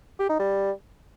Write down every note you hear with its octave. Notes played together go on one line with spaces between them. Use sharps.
G4
D#4
G3